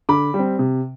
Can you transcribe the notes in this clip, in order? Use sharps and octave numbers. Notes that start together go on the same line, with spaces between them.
D3 B5 D6
G3
C4
C3